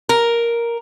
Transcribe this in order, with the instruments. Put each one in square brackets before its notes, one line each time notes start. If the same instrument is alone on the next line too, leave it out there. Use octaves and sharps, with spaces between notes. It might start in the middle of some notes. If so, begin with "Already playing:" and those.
[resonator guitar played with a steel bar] A#4